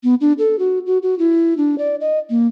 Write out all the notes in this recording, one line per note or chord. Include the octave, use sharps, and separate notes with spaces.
B3
D4
A4
F#4
F#4
F#4
E4
D4
D5
D#5
A#3